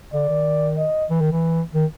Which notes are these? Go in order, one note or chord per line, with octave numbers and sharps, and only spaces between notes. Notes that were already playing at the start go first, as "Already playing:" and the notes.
D3 D5
D#3
D#5
E3
D#3
E3
D#3